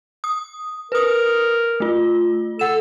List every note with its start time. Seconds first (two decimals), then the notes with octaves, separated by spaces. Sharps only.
0.24 D#6
0.92 A#4 B4 D#6
1.80 A3 F4
2.59 A4 F#5 E7